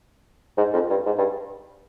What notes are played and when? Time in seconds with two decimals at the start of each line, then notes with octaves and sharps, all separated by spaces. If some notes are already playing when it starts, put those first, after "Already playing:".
0.57 G#2
0.74 F2
0.90 G2
1.06 G#2
1.18 G2